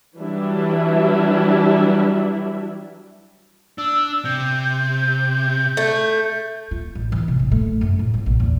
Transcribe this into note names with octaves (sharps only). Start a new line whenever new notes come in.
E3 F#3 G3 D4 E4
D4 E6
C3 G6
A3
F4
A1
E3
C3
A1
A3
F#2
A2
F#3
A#1
E2